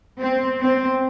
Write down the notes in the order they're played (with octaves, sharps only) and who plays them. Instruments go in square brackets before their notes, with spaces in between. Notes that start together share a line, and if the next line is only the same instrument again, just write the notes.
[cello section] C4
C4